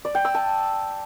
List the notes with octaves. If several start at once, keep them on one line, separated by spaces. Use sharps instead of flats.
D5
G5
E6
A5